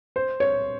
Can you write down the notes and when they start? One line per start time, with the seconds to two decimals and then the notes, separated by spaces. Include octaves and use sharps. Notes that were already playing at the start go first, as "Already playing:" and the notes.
0.16 C5
0.40 C#5